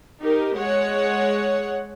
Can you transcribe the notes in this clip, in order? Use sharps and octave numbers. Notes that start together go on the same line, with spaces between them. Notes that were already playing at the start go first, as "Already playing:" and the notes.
D#4 G4 A#4
G#3 C#5 F#5